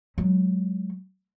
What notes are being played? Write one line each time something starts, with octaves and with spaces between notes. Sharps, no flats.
F#3 G#3